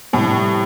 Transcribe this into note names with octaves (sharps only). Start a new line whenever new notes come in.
F2 A2 C3 G3